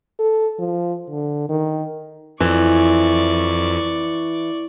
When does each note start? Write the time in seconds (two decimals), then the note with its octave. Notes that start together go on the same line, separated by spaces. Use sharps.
0.19 A4
0.59 F3
1.10 D3
1.49 D#3
2.40 F2 E3 D5 C#6